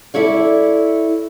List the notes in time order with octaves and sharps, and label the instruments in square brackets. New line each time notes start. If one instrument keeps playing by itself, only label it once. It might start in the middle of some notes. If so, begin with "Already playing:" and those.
[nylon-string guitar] E4 A4 C#5 D5